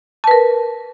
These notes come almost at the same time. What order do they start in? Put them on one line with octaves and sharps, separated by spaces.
A5 B4 A#4